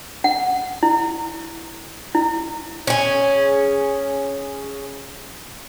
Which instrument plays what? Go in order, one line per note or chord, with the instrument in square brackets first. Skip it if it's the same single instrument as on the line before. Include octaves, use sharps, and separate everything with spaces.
[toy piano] F#5
E4
E4
[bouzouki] C#4 G#4